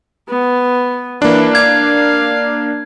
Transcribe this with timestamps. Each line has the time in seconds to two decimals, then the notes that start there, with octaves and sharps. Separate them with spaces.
0.29 B3
1.22 E3 A#3 D4
1.55 F5 G#6